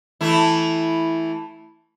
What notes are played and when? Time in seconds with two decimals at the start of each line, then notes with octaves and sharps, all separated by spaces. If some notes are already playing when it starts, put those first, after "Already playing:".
0.21 E3 A3 E4